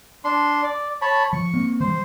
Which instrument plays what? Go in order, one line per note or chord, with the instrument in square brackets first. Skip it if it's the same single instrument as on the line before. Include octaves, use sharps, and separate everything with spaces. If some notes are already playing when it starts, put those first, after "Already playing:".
[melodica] D4 C6
D5
C#5 A5 B5
[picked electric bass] F3 [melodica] C#6
[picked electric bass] A#3 C4
[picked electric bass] E3 G3 [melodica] C5